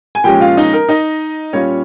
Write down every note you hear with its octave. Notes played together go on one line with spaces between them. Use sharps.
G#5
A#2 F3 G#3 C#4 G4 G5
F4 F5
D#4 D#5
A#4
D#4 D#5
A#2 G3 C#4 F4 C#5